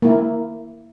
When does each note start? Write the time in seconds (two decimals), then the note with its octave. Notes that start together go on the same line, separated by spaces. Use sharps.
0.02 A#3 E4